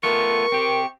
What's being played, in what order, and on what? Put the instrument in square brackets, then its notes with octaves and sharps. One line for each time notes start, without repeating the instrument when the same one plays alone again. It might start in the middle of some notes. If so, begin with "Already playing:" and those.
[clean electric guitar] A3 B3 F4 [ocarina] A#4 [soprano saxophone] C#6
[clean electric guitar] C4 G4